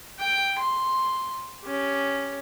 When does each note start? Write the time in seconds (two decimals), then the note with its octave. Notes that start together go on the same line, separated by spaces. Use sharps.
0.20 G5
0.59 C6
1.63 C#4 G4